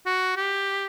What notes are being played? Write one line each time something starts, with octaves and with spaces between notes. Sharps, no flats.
F#4
G4